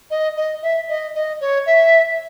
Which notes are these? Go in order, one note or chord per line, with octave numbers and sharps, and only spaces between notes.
D#5
D#5
E5
D#5
D#5
C#5
E5